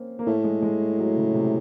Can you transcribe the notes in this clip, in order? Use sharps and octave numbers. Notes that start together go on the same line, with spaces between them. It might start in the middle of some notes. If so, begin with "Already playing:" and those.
Already playing: A#3 C4 C#4
A#3
A2 A3
G#3
G#3
F#3
C#3
C3